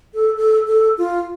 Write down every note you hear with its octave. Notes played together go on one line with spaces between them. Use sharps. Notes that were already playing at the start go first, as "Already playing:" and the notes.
A4
A4
A4
F4